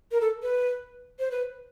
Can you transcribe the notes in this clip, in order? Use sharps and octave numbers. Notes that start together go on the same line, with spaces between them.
A#4
A4
B4
C5
B4